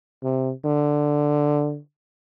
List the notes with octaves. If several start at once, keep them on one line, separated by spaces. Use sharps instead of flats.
C3
D3